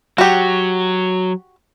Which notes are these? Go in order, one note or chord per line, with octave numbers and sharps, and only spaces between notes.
F#3 F#4 G4